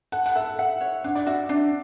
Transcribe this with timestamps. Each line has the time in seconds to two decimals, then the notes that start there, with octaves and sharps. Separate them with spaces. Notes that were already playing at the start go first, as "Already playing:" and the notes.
0.12 A4 F#5
0.26 F#5
0.35 A4 E5
0.59 E5 F#5
0.81 C#5
1.04 D4 F#5
1.15 D5
1.27 F#4 E5
1.49 D4 D5